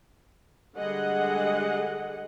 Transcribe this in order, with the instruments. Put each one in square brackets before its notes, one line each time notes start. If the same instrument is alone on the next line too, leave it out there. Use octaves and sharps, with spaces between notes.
[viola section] D3 G3 G#3 G#4 D#5 F#5